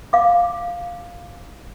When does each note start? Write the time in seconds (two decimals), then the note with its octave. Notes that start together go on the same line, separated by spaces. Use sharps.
0.13 F5 D6